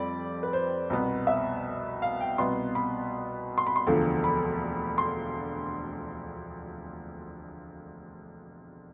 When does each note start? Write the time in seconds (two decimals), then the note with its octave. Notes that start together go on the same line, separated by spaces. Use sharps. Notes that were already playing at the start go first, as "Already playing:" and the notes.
Already playing: F2 G3 C4 D5 B5
0.43 B4
0.53 C5
0.90 C2 B2 B3
1.27 E5
2.02 F5
2.21 G5
2.38 C2 B2 B3 C6
2.75 B5
3.58 C6
3.67 B5
3.76 C6
3.87 E1 D2 D3 F3
4.24 B5
4.98 C6